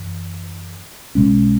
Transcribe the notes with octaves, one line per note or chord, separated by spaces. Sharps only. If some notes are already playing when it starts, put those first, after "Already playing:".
Already playing: F#2 E3
B1 B2 G#3 C#4